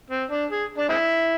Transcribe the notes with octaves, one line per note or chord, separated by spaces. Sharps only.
C4
D4
G#4
D4
G#3 C4 E4